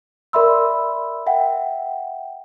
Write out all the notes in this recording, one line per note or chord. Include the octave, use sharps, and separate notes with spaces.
A#4 D5 E5 B5 C6 E6
E5 F#5 G5